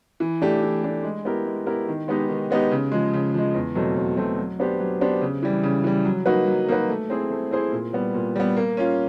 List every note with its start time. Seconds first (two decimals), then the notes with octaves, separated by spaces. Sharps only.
0.20 E3
0.42 A3 D4 G4
0.62 E3
0.84 A3 D4 G4
1.03 G#3
1.25 B3 E4 G4 A#4
1.46 G#3
1.67 B3 E4 G4 A#4
1.88 D#3
2.08 G#3 B3 D#4 G4
2.29 D#3
2.51 G#3 B3 D#4 G4
2.71 C#3
2.92 F3 G#3
3.13 C#3
3.34 F3 G#3
3.55 E2
3.75 B2 F#3 A3 C4
3.96 E2
4.17 B2 F#3 A3 C4
4.38 F#3
4.59 B3 D4 G4 C5
4.80 F#3
5.01 B3 D4 G4 C5
5.21 C#3
5.42 E3 G3
5.63 C#3
5.84 E3 G3
6.05 F#3
6.26 A#3 D#4 F#4 B4
6.47 F#3
6.68 A#3 D#4 F#4 B4
6.89 A3
7.10 C4 E4 G#4 C5
7.30 A3
7.51 C4 E4 G#4 C5
7.72 A#2
7.93 G3 B3
8.14 A#2
8.36 G3 B3
8.57 A#3
8.77 C#4 F4